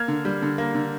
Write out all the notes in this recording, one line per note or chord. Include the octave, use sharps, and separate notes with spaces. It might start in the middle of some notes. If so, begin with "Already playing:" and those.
Already playing: A#3 F6 G#6
D3
G3
D3
A#3
D3